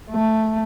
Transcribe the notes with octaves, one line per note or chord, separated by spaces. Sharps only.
A3